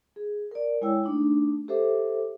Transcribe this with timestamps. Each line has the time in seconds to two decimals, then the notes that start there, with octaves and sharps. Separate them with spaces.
0.16 G#4
0.51 A#4 D5
0.81 G#3 E4 C#5 G5 E6
1.04 A3 D4 D#4
1.68 G4 A4 C5 E5 D6